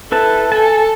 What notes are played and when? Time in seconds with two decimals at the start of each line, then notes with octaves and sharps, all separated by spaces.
0.12 E4 A4 B4 A5
0.52 A4 G#5 A5